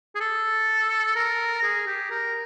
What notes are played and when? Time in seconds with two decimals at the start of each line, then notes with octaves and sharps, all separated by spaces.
0.15 G#4
0.20 A4
1.16 A#4
1.63 G#4
1.86 G4
2.11 A#4